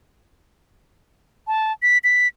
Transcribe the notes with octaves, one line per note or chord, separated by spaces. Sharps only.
A5
B6
B6